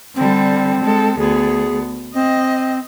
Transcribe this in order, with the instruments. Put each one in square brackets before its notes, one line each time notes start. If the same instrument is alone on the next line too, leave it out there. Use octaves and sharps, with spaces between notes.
[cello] D3 G3 [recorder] C4
[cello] G#3 A4
[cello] D2 B3 [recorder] G#4
[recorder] C4 [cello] D#5